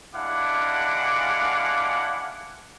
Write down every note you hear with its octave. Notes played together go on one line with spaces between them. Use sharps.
G#3 D4 E4 F5 F#5 D6